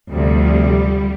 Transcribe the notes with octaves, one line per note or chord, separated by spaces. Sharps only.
D2 C3 F3 G3